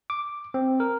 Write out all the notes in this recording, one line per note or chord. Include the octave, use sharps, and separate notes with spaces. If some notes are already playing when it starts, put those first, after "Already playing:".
D6
C4
A#4